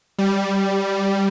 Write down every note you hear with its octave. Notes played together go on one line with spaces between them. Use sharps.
G3